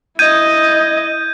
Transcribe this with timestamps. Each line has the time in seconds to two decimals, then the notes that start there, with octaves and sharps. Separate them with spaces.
0.19 E4 D#5 G6 G#6 D#7